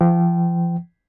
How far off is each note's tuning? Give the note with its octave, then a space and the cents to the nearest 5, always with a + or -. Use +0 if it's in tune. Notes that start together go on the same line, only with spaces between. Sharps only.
F3 -35 G5 -25